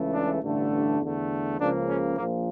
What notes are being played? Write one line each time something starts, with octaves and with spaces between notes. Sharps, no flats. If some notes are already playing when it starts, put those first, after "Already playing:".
Already playing: C#2 C#3 E3 A3
D4
A1 G2 D3 A3
D4
E2 D3 A3
C#2 C#3 F3 A#3 D4
C#4
A#1 A#2 F3 A#3